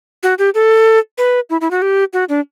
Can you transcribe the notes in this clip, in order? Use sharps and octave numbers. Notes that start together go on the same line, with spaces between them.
F#4
G4
A4
B4
E4
E4
F#4
G4
F#4
D4